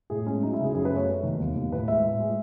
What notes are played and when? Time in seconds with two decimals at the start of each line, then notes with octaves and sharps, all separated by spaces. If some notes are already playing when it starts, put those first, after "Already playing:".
0.10 A2 G#4
0.27 G#3 C#4
0.42 F#3 D#4
0.53 E4
0.59 C#3 G#4
0.75 F#2 G#4
0.85 B4
0.91 A3
0.97 C#5
1.07 A3
1.23 D#3
1.40 D#2
1.56 D#2
1.72 A2 B4
1.88 G#3 E5
2.04 A2
2.20 G#3